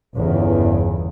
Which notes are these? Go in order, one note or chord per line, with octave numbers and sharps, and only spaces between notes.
G1 E2 C#3